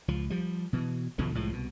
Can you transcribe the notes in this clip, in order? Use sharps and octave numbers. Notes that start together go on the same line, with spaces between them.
C#2 F3
F3 G3
B2 E3
E2 B2 D3 F3
C2 A2 F3 G#3
C2 B2